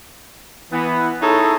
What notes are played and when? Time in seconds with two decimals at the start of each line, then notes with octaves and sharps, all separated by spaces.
0.73 E3 B3
1.22 D#4 E4 G#4 A4 C#5